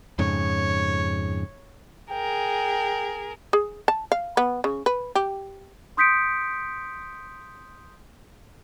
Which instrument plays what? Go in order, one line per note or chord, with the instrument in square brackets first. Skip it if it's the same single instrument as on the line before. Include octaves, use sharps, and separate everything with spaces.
[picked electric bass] F2 G#2 C#3 [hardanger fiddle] C#5
[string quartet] G#4 A#4 [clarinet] G5
[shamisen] G#4
A5
F5
B3
C#3
B4
G4
[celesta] C6 D#6 G6 B6 C#7 D7